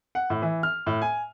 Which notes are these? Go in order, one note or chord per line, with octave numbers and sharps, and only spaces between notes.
F#5
A2
E3
F6
A2
G#5